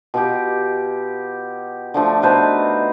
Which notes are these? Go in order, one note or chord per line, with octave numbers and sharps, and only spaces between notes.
B2 F4 G4
D3 F3 A3
B2 D#4 B4 C5